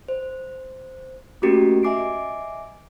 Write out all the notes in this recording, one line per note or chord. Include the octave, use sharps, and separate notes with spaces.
C5
A3 A#3 C#4 F#4 G4 A#4
D#5 E5 G#5 D6 C7 D7